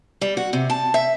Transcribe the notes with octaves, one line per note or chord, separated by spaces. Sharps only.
G3
F#4
C3
A5
E5